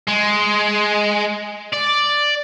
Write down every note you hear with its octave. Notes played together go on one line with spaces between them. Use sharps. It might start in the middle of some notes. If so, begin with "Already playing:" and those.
G#3
D5